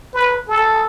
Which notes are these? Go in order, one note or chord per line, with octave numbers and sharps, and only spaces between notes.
B4
A4